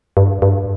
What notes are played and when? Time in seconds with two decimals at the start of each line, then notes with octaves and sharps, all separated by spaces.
0.17 G2
0.42 G2